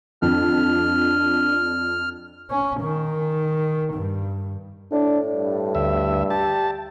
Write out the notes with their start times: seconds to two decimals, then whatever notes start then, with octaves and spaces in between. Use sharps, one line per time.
0.22 F2 D4 F6
2.50 C#4
2.81 D#3
3.94 G2
4.92 A2 D4
5.33 G2
5.75 D2 E5
6.30 G4 A5